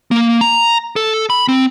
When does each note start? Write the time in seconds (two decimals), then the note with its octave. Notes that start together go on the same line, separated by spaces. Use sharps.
0.11 A#3
0.41 A#5
0.96 A4
1.30 B5
1.48 C4